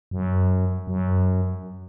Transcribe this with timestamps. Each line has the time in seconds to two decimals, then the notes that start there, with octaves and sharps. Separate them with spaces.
0.11 F#2
0.87 F#2